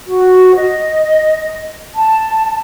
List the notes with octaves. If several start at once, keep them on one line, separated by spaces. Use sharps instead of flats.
F#4
D#5
A5